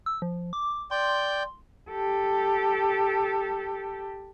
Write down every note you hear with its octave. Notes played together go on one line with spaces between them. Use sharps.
E6
F3
D6
D5 G5 C6 G6
C6
G4 A4